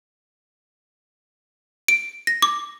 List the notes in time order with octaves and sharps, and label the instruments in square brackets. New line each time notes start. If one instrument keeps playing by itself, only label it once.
[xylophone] D7
A#6
D6